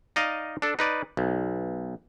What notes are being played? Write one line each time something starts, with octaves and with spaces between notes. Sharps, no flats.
D#4 D5 D#5 F5
D4 A4
D#4 B4 D5
B1